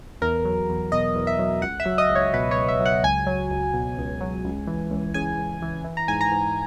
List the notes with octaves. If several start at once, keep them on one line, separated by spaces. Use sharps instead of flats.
E2 A#4
F#3
E2
B2 D#5
E2
E5
F#3
C#2 F#5
E5
F#3
D#5
C#2
C#5
B2 B4
C#2 C#5
E5
F#3
F#5
C#2 G#5
F#3
C#2
B2
C#2
F#3
C#2
E3
C#2
C#3 G#5
C#2
E3
E3
A#5
G#2 G#5
A#5
G#2